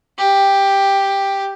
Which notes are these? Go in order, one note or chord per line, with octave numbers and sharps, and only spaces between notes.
G4